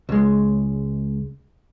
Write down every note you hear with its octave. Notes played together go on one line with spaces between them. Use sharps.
C#2 G#3